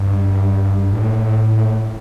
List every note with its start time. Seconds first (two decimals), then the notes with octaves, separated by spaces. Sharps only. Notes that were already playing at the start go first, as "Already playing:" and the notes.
Already playing: G2
0.92 A2